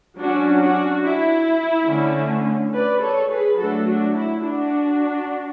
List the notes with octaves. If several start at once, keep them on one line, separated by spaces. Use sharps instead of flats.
F#3 C#4 D4 F#4
D4 F#4
E4
D3 A3 C#4
B4 D5
A4 C#5
G#4 B4
F#3 A3 D4 F#4 A4
D4 F#4
E4
D4 F#4